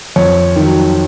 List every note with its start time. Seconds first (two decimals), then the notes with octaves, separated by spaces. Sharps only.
0.16 F2 C#5
0.56 D#3
0.61 F#3